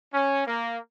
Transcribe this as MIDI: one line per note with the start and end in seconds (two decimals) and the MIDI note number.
0.14 0.46 61
0.47 0.78 58